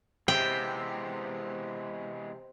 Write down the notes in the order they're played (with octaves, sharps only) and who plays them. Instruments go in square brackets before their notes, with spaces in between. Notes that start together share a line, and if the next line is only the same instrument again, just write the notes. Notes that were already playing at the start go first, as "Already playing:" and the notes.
[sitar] C3 [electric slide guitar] E3 G#3 B3 [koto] G5